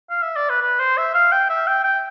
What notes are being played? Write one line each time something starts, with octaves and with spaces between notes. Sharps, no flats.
F5
E5
D5
B4
B4
C5
E5
F5
G5
E5
G5
G5